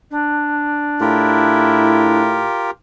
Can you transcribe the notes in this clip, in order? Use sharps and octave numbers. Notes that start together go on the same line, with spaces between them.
D4
A2 E4 F4 G4 A#4